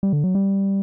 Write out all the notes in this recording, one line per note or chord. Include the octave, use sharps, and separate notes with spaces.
G3
D3
F#3
G3